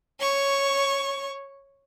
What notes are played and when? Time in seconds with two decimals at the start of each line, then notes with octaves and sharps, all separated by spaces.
0.20 C#5 C#6